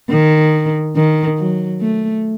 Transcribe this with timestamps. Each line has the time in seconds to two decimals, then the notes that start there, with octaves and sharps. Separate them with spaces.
0.10 D#3
0.96 D#3
1.38 F#3
1.81 A3